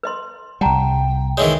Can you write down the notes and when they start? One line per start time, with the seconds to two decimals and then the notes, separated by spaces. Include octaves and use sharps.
0.03 B4 D#5 C6
0.61 C2 G3 F#5 G5 A5 A#5
1.37 D#3 E3 G#3 G#4 C#5